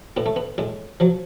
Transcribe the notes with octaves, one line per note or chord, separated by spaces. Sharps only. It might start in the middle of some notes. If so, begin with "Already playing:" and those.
A2 B3
A3
B3
A2 G#3
F3 F#3